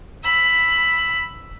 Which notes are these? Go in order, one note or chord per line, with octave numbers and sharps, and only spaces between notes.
B5 E6